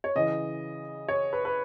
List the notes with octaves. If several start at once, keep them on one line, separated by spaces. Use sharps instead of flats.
C#5
C#3 E3 D#5
C#5
B4
B4